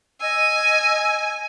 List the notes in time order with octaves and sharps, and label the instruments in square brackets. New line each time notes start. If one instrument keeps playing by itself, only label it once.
[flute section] D#5 E6 [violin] G#5